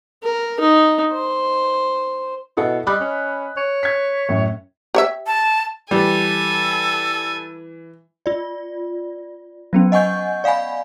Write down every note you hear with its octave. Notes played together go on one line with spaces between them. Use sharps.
A#4
D#4
C5
B2 E4 A4 F#5
G3 D#5 B5 F#6
C#4
C#5
G#6 B6
F#2 A2
G4 C#5 E5
A5
E3 G3 A4 G#5
F4 D5
F#3 B3 C#4
D#5 F#5 G#5 C#6 G6
D5 F5 F#5 G#5 B5